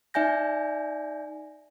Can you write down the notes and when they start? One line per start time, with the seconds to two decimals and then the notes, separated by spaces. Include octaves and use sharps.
0.14 D#4 D5 E5 G#5 G6 A#6